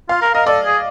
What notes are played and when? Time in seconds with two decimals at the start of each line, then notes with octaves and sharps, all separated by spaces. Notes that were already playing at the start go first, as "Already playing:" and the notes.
0.09 F4 F5
0.22 A#4
0.35 A#4 D#5
0.47 A4 D5
0.65 G#4